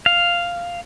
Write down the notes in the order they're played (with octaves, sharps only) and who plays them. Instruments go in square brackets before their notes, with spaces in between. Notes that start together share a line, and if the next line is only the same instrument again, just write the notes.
[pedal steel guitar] F5